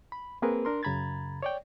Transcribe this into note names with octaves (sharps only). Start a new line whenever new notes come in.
B5
A#3 C4 G#4 A#4 B4
D4 A#4 C6
F#2 C#3 A#5 B5 G#6 A6
C#5 D5 G5